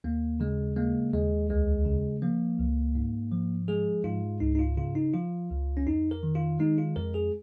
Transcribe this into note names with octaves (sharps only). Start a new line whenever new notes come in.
D#2 A#3
C#3 G#3
G#3 A#3
D#2 G#3
C#2 G#3
C#3
F3 A#3
C#2
G#2
F3
G#3 G#4
G#2 F4
C#2 D#4
D#4
F4
C#3 F4
D#4
F3 F4
C#2
C#4
F2 D#4
A#4
D#3
F4
G#3 D#4
F4
F2 A#4
G#4